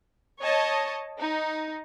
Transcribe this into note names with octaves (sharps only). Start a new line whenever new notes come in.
C#5 D#5 A5
D#4